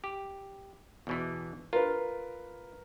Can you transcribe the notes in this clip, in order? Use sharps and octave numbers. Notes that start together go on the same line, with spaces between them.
G4
E2 B2 E3
F4 A#4 B4